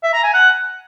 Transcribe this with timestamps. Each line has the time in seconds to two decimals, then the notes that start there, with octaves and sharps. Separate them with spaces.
0.03 E5
0.13 A#5
0.24 G#5
0.34 F#5